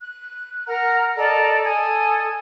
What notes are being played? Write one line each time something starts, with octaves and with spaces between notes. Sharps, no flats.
F#6
A#4 F#5 A#5 F6
A4 D5 D#5 A#5
A4 G#5 D#6 G#6